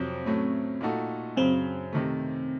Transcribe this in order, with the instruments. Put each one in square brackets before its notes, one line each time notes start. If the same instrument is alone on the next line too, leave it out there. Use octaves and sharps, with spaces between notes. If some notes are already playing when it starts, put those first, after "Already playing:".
Already playing: [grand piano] F2 C3 F#3 [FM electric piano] C4
[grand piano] A2 F#3 A3 C#4
A#2 A3 D#4 F#4 A4
[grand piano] F#2 C#3 F#3 [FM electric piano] C4
[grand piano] C3 D#3 A3